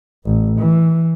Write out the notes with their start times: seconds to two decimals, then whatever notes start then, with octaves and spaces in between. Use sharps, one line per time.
0.25 A1
0.59 E3